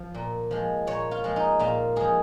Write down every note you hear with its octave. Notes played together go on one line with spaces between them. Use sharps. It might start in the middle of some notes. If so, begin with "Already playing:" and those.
Already playing: F3
A#2
F3 G#3
A#2 C#5
F4
F3 G#3
D#4
A#2 F4
F3 G#3 G#4